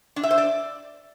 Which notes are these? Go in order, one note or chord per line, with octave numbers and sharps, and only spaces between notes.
D4
E5
C5
D5